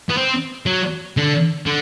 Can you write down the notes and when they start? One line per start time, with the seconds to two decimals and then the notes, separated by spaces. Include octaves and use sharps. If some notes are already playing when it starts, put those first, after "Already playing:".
0.09 B3
0.17 C4
0.66 F#3
1.17 D3
1.66 D3